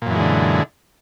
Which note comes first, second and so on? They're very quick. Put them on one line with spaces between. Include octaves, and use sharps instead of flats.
A#2 F#2 E3 G#3 D3